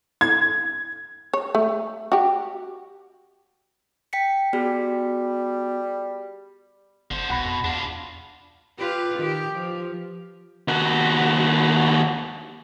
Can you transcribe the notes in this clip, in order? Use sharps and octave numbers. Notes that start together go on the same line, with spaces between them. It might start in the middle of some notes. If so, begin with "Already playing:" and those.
G#6
C#5
A3
F#4 G4
G5 B6 C#7
G3 B3 F#4 G#4
G1 D3 C5
C2 B2 F#5 B5 A#6
F2
E2 D4 F4
F4 G4 B4
D#3 G4
F3
D#2 F#4